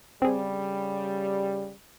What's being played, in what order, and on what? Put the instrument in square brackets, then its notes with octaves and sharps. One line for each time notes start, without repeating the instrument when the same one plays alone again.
[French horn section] C#3 G3 [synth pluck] C4 G#4